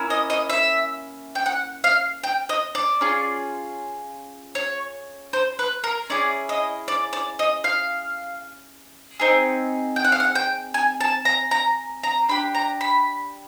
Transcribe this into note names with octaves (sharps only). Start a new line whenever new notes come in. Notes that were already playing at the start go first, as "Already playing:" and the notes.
Already playing: A#3 C#4 E4
D#5
D#5
E5
G5
F#5
F5
G5
D#5
D5
C#4 F4 G#4
C#5
C5
B4
A#4
C#4 E4 G#4 D5
D#5
D5
D5
D#5
F5
C4 D#4 G#4
G5
F#5
F5
F#5
G5
G#5
A5
A#5
A#5
A#5
D4 G4 B5
A#5
B5